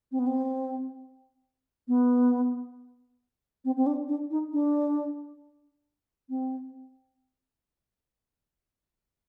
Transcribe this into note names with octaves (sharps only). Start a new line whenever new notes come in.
C4
B3
C4
B3
C4
C4
D4
D4
D#4
D4
C4